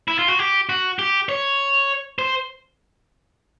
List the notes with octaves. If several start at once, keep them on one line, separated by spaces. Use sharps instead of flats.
E4
F4
F#4
G4
F#4
G4
C#5
C5